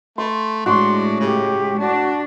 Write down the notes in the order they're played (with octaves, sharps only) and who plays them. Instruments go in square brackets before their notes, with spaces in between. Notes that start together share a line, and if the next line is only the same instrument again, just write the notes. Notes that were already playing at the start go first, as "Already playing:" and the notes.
[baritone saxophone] A3 [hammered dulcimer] C6
[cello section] A2 G#3 [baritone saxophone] D4 [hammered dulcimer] F#4 [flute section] C6
[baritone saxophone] C#3 [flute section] G4
[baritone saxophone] A2 [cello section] D4 [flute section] F#4 A5